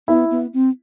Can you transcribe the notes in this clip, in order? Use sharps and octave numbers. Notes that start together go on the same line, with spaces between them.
B3 E4
B3
C4